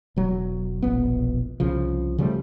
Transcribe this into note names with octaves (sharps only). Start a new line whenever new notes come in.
E1 F#3
E1 A#1 B3
C2 C#3 F3
C#3 F3 G3 A3